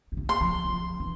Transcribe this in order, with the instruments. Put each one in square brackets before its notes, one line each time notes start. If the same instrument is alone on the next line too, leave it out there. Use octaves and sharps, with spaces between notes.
[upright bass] F3
E3
[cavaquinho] C6
[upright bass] F3
F3
E3